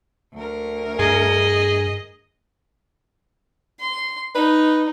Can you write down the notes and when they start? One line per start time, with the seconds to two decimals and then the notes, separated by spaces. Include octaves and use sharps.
0.34 D2 A#4
0.99 G2 G#4 D#5
3.80 C6
4.35 D#4 B4